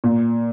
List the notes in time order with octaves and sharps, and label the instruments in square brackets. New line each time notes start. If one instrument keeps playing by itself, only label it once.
[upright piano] A#2